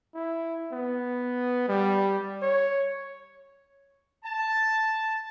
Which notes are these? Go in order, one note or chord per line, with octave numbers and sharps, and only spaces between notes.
E4
B3
G3
C#5
A5